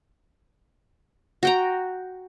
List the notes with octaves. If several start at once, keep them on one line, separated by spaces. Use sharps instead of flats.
F#4 G5 A#5